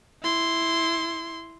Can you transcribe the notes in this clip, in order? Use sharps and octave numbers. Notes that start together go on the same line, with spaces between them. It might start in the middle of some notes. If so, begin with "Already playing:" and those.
E4 C6